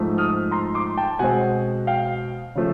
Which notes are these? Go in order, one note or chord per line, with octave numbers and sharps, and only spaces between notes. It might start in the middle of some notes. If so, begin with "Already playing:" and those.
Already playing: G#2 F3 A3
D#6 F6
A#5 C6
C6 D6
G5 A5
B2 G#3 C4 F#5 G#5
F5 G5
C#3 F3 A3